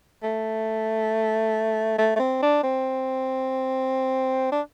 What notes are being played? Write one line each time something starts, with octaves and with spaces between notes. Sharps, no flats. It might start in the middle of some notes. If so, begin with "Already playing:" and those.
A3
A3
A3
C4
D4
C4
D4